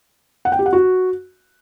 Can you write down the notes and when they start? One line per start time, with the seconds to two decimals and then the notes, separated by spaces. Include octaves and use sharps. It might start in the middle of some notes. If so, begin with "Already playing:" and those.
0.45 F#5
0.52 G5
0.59 G4
0.66 F#5
0.73 F#4